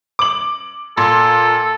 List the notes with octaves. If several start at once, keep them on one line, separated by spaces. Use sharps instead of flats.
D6 F#7
A#2 A4